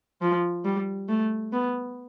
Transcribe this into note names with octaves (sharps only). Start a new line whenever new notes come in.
F3
G3
A3
B3